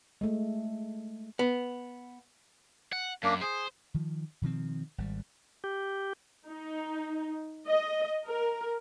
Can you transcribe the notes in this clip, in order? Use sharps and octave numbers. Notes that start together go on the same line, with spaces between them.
G#3 A3
B3
F#5
F#2 A#3 D4
G#4 C5
D#3 F3
B2 D#3 F3 C4
G#1 G3
G4
D#4
D#5
A#4